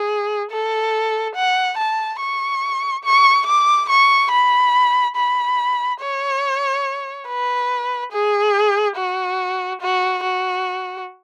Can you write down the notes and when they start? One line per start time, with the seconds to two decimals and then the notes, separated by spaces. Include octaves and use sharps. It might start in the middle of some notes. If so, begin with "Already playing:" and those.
Already playing: G#4
0.51 A4
1.36 F#5
1.78 A5
2.20 C#6
3.04 C#6
3.47 D6
3.90 C#6
4.32 B5
5.16 B5
6.01 C#5
7.28 B4
8.12 G#4
8.97 F#4
9.81 F#4
10.24 F#4